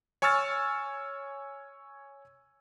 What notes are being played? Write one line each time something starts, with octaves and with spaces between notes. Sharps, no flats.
C#5 G#5 C#6 E6 F6 A6